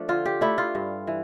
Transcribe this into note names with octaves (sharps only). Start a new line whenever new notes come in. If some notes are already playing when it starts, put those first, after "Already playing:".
Already playing: F3 A3 D4
D3 F4
G4
A3 D4 E4
F4
G2
E3